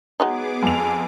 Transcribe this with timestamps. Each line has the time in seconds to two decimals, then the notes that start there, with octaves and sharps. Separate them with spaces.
0.20 F#3 G#3 B3 D#4 G#4 D6
0.63 F2 G#5 F7